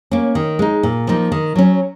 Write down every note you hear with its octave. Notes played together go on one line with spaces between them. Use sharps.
A#3 C#4
D#3
G#3 D#4
A#2
F3 A#3 D#4
D#3
F#3 C#4